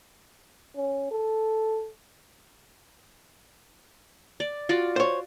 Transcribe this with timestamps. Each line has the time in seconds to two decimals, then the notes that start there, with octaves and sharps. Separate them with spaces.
0.77 C#4
1.11 A4
4.40 D5
4.69 F4 F#4 D5
4.96 C5 C#5